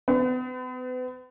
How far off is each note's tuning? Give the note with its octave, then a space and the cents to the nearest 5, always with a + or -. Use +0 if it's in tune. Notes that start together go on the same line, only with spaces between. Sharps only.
B3 +40